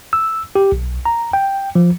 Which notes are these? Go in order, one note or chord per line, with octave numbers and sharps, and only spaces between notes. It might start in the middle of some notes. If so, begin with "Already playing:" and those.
E6
G4
B1
A#5
G5
F3